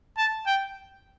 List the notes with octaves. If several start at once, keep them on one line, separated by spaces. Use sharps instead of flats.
A5
G5